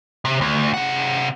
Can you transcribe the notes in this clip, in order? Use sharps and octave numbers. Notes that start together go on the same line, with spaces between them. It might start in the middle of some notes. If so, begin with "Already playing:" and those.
C3
D2
C3 F#5